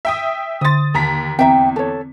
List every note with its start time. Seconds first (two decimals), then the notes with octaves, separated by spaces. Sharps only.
0.05 E5 G5 D#6
0.61 D3 C6 D#6 A6
0.94 D#2 A5 A#5 B6
1.39 E2 C4 E5 G5 A#5
1.76 A4 C#5